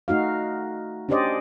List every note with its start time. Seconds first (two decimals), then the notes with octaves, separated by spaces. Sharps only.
0.08 A3 D#4 F#4 F5
1.09 C#4 D4 G4 C5 D5 D#5